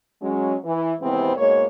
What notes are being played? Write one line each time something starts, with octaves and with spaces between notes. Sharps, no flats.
F#3 G#3 C#4
E3
D#2 G#2 C3 E3 B3 C4
G#2 B2 G#3 A#3 C#5